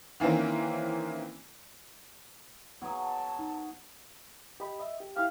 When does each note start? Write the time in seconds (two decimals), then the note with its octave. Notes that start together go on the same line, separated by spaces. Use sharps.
0.20 D#3 E3 A#3 C4 C#4
2.81 F#3 B3 G#4
3.01 A5
3.39 D#4
4.60 G4 D#5 B5
4.79 D#5 E5
5.00 G4
5.17 E4 G4 F5